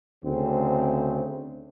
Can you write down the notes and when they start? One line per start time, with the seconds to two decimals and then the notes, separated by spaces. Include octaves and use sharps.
0.23 D2 C#3 C4